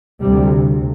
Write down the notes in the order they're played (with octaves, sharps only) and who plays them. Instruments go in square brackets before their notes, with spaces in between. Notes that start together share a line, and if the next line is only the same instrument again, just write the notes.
[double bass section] D2 C3 G3